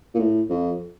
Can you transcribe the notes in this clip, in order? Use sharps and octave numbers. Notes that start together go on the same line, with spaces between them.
A#2
A2
F2